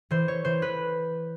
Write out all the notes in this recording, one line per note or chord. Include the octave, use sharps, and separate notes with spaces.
E3 C5
C#5
E3 C5
B4